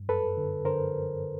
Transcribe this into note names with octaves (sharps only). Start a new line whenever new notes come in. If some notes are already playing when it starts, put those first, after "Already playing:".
Already playing: G2
F#2 A4 B4
D3
D3 A#4 C5